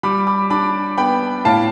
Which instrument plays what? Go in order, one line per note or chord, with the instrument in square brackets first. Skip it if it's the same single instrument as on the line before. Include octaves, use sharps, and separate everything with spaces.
[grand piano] G3 B5 D6
B5 D6
D4 B5 D6
B3 G5 B5
A2 F5 A5